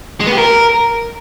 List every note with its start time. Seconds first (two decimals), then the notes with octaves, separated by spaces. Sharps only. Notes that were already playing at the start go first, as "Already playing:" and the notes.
0.20 G#3
0.26 B3
0.32 G4
0.38 A#4